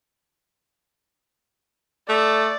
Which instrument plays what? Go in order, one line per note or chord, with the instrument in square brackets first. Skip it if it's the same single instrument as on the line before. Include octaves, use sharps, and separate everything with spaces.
[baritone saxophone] A3 [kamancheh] D5